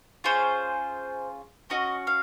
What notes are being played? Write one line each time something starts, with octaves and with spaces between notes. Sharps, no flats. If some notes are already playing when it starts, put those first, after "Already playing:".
C#4 F4 G#4 C5
C#4 F#4 D#5
F5